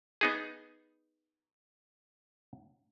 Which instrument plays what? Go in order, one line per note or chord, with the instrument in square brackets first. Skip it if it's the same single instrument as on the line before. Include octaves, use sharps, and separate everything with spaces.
[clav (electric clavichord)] B3 D#4 G#4